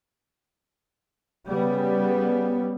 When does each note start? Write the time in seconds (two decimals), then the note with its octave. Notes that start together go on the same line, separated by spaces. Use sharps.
1.48 C#3 G3 B3